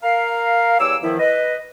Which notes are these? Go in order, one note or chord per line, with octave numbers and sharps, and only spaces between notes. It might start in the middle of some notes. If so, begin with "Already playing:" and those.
A#4 F5
E2 G3 C#5 G#5 D6 E6
E2 D#3 F3 E4
B4 D#5